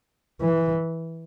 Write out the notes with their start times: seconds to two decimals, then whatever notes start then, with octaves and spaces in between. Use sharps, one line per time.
0.41 E3